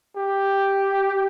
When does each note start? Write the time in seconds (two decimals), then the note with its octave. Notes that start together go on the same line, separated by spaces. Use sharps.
0.16 G4